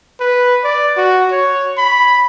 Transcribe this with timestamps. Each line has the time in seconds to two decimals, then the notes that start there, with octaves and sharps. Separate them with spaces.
0.20 B4
0.64 D5
0.97 F#4
1.32 C#5
1.78 B5